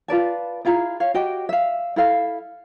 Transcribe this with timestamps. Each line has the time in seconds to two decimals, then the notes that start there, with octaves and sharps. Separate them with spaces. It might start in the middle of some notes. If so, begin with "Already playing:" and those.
0.08 F4 B4 D5 A5
0.65 E4 F4 G#4 A#5
1.00 C#5 F5
1.14 F#4 G4 D#5 G5
1.49 E5 F5
1.96 E4 A4 F5